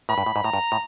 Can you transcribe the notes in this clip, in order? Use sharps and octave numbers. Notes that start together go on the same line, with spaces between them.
A2 B5
G2
A2
G#2
A2 A#5
G2
A2